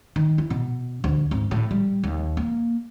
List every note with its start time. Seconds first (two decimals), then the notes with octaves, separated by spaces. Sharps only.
0.16 D#3
0.38 E4
0.50 B2
1.04 D2
1.31 G#1
1.51 A2
1.71 G3
2.04 D#2
2.37 A#3